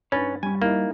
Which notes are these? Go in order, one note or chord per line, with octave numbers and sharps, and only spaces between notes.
G2 C#4 D#4 B4 C#5 B5 A6
G3 C#4 G#5
A#3 D#4 E4 D#5